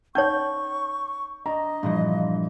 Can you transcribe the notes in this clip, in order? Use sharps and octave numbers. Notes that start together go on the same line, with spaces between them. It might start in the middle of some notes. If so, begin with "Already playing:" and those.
C#4 D#4 C#5 C#6 G6
D4 D#5 A#5
G2 A#2 E3 F3